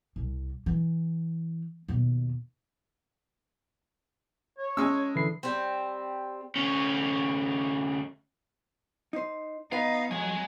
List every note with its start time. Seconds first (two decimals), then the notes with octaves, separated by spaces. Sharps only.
0.16 C2
0.66 E3
1.88 D#2 B2
4.58 C#5
4.77 G#3 C#4 E6
5.15 D3 E3 E4 C7
5.43 G3 C4
6.56 D2 C#4
9.13 D#4 C5
9.72 B3 D#4 B4 F5
10.11 F2 F#3 G#3 G#5